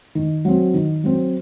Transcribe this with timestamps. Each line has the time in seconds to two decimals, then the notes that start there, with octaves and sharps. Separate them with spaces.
0.15 D#3
0.45 F#3 C4
0.74 D#3
1.04 F#3 C4